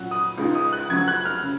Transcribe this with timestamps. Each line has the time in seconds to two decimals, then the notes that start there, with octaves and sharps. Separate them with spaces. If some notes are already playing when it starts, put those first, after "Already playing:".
Already playing: A#2 F#3 C#4 F#6
0.11 D#6
0.38 C#2 C#3 G#3 D#4
0.55 D#6
0.73 F#6
0.90 F#2 C#3 F#3 C#4 G#6
1.08 F#6
1.25 F6
1.43 C#3